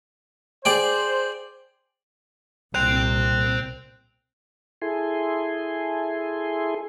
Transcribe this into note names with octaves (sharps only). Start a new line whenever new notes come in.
G#4 C5 D5 G5
C2 A#2 C5 G5 F#6 F7
E4 G#4 A4 G#5 C6